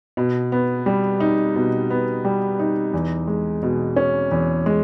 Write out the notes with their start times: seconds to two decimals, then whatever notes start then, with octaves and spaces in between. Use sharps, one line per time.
0.17 B2
0.52 B3
0.86 G3
1.20 D#4
1.56 B2
1.90 B3
2.25 G3
2.59 D#4
2.93 E2
3.27 G#3
3.63 B2
3.96 C#4
4.31 E2
4.66 G#3